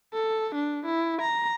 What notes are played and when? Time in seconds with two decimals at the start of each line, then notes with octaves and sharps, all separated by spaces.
0.13 A4
0.55 D4
0.86 E4
1.21 A#5